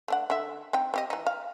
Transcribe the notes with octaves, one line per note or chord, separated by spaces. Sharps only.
A3 D4 F#5
D3 E5
C4 D#4 G5
C4 G4 D#5
E3 D#4
F5